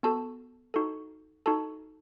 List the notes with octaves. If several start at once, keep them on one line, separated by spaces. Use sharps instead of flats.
B3 F#4 A4 A5
D#4 F#4 A4
D#4 F#4 A4 A5